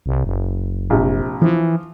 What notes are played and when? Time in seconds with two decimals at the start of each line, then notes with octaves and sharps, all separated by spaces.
0.06 C2
0.25 F#1
0.90 A#1 C3
1.42 E3 F3